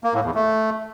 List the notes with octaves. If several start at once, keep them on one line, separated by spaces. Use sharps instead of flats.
A#3
A2
E2
A3